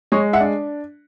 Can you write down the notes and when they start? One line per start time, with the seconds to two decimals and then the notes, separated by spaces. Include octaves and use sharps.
0.12 G#3 C#5 D#5
0.33 E5 F#5
0.40 D4